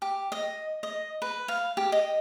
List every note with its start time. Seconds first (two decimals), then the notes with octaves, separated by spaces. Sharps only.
0.02 G4
0.32 D#5
0.83 D#5
1.22 B4
1.48 F5
1.77 G4
1.92 D#5